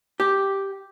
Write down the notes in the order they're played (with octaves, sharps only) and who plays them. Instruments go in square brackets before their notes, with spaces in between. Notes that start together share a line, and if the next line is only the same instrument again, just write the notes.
[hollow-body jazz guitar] G4